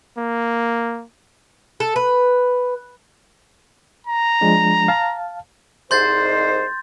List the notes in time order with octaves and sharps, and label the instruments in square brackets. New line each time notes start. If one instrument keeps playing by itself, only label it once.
[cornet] A#3
[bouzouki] A4
B4
[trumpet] A#5
[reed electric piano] F3 G#3 D4
F5 A5
[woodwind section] C2 G#2 C5 [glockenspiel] C6 G6 A6